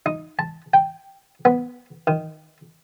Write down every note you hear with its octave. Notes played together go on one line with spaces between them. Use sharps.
D#4
A5
G5
B3
D#3